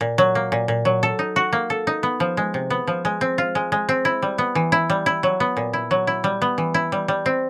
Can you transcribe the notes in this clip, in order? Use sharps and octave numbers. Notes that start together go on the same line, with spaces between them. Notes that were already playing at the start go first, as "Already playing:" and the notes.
A#2
F#3
A#3
A#2
A#2
F#3
A4
D#4
F#4
A#3
A4
D#4
B3
F3
G#3
C3
B3
F3
G#3
C4
F4
G#3
G#3
C4
E4
G3
B3
E3
E4
G3
E4
F#3
B3
A#2
E4
F#3
E4
G3
B3
E3
E4
G3
G3
C4